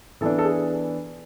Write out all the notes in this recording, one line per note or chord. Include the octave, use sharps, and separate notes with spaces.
E3 B3 D4 A4
A4
G#4